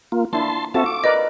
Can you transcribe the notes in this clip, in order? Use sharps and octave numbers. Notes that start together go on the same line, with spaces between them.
A#3 F4
A#3 D4 E4 A5 C6
C4 F4 F#4 A4 E5 A5
D6
A#4 B4 D5 D#5